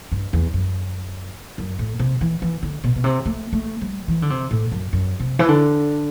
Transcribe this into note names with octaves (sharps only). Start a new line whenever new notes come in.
G2
E2
F#2
F#2
A2
C3
E3
E3
D3
B2
B2
C3
A3
A3
G3
E3
D3
C3
A2
F#2
F#2
C3
E3
D3